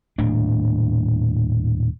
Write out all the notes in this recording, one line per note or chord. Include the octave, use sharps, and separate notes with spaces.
D#1 A2 D4